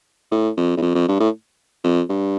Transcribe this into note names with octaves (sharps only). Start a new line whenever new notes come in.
A2
F2
E2
F2
F2
G2
A2
F2
G2